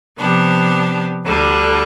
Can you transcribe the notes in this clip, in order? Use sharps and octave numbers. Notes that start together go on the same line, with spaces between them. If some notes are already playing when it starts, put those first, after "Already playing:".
C3 F3 B3 D4 G4
D2 D3 G3 D4